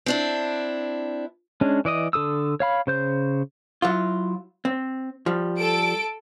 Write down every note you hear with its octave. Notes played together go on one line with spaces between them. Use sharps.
C4 D4 E4
G#3 C#4 D4
E3 D5 D#5 D#6
D3 A4 D#6 E6
C#5 F5 B5
C#3 C5 G6
F#3 E4 F4
C4
F3 G3
A4 D7